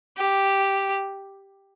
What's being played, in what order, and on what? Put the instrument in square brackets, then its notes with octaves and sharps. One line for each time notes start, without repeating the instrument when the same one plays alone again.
[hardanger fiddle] G4